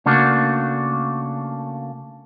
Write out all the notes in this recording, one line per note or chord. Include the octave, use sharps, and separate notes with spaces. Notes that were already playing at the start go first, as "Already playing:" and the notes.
C#3 A3 A#3 D4 F#4